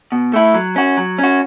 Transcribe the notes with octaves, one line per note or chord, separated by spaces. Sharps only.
B2
A3 E4
F#3
C#4 F#4
F#3
C#4 F#4